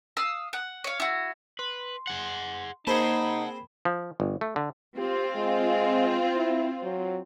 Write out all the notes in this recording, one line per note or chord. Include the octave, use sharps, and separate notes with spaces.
F5 D#6 E6
F#5
C#5 F5
E4 F#4
B4 C6
G#4 F#5
A#3 C4 D#4 G#4 C5 F#5 A5 B5
F3
G1
A3
D3
C4 F4 G4
G#3
E4
F#3